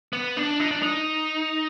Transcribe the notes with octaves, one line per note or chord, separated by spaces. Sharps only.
B3
D4
D#4
D4
D#4